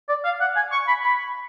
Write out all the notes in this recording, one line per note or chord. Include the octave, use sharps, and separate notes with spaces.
D5
F5
F#5
G#5
C#6
B5
B5